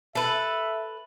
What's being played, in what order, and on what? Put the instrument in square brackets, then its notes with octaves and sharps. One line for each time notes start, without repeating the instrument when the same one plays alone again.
[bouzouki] A4 B4 [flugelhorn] E5